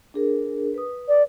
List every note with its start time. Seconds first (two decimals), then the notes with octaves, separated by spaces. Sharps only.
0.14 D4 G#4 A#4
0.74 B4 D#6
1.08 D5